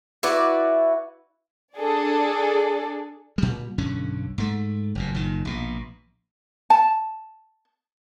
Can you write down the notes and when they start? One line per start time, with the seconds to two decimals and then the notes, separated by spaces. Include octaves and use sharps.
0.23 E4 F#4 B4 D5
1.74 D4 G#4 A4 D5
3.38 A#2 G3
3.78 B1 G2 D3 C#4
4.38 G#2 A3
4.95 F#1 G2 A#2
5.14 F#1 A#2 D#3
5.45 A#1 B2
6.70 A5